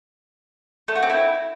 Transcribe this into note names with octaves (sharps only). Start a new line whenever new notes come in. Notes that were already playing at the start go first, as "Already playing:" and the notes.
A3
F#4
C4
E4